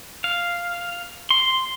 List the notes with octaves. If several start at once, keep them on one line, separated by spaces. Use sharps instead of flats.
F5
C6